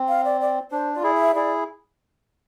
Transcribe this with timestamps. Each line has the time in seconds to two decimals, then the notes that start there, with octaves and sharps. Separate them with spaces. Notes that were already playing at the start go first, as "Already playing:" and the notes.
Already playing: C4
0.08 F5
0.24 D5
0.41 D5
0.71 D4 C5
0.93 F4 D5
1.03 E4 G#4
1.14 E5
1.35 E4 G#4 D5